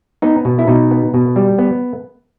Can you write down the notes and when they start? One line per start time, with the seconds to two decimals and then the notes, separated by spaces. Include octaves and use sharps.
0.22 B3 D#4
0.45 B2
0.59 E4
0.68 B2 D#4
0.91 B3
1.14 B2
1.36 G3
1.58 B3